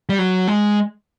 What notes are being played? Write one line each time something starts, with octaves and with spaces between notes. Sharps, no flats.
G3
F#3
G#3